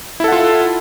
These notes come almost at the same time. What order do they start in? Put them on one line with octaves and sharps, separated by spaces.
E4 A4 F#5 F4